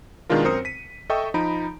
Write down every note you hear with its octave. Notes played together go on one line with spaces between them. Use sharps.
B2 D#3 G#3 D4 F4 A#4
F#2 C4 A#4 C5 D#6 C#7
B6 D#7
A4 D#5 E5 G5 C#6 D#6
F3 D#4 A#5 B5 D7